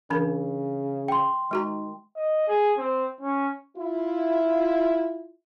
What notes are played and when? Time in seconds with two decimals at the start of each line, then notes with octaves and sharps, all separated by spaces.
0.10 C#3 E3 D4 A#4
1.08 G5 C6
1.51 D#3 G#3 F#4 A#5
2.16 D#5
2.48 G#4
2.78 C4
3.21 C#4
3.76 E4 F4